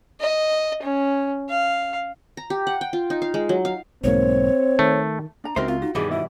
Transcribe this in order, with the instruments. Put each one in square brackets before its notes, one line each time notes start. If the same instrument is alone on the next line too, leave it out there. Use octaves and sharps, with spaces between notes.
[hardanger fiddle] D#5
C#4
F5
[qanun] A#5
G4
F#5
G5
F4
D#4
F5
G#3
F#3
F5
[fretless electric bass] B1 G#2 A#3 [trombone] C4 [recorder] C#5
[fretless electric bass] D#3 [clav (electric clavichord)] A3
[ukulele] D4 A#5
[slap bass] C#2 [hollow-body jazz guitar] C4 D#4 C5 [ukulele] F#4 A#4 E5
[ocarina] C4 [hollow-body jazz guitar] F4
[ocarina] D#4 [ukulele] F#4
[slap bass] G2 D#3 [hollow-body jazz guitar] B2 E3 G3 [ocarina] G#4
[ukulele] E4 F#4 [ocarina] E5